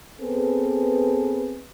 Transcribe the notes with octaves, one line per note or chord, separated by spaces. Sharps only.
B3 C4 G#4 A4 B4